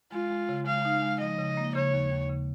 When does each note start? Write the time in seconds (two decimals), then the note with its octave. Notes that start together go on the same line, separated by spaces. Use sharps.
0.12 G#3 F4
0.30 G#3
0.49 C#3
0.66 G#3 F5
0.85 D#4
1.02 G#3
1.20 F3 D#5
1.38 C#3
1.57 A#3
1.75 C#3 C#5
1.93 D#2
2.11 D#2
2.29 C#3